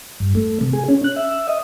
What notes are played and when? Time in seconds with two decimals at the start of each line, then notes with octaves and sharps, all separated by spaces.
0.20 G2
0.35 A3
0.61 C3
0.73 G#4
0.88 C#4
1.04 F#6
1.16 E5
1.48 D#5